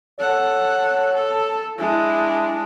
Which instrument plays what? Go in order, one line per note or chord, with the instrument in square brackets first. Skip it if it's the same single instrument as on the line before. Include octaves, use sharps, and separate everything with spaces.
[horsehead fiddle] A4 F#5 [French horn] C#5
[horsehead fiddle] A4
[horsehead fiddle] G#3 D4 [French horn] E4